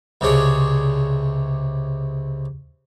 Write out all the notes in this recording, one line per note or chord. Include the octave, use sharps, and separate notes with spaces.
C#2 C3 D4 G#4 C#5